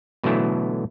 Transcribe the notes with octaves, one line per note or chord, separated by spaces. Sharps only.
B2 D3 E3 F#3 A3 E4